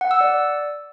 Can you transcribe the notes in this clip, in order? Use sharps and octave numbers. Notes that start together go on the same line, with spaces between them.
F#5
E6
D5